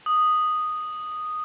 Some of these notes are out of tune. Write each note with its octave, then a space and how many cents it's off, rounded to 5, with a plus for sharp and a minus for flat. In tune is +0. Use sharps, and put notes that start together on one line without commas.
D#6 -5